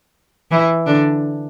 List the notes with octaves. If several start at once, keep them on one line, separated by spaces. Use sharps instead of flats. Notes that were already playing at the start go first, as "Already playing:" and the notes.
E3 E4
D3 D4